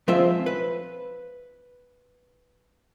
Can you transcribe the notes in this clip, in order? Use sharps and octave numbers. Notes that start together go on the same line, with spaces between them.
F3 G#3 C4 F4 C5 E5
B4